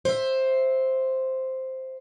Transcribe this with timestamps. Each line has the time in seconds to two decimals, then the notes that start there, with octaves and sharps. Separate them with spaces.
0.05 C5 E5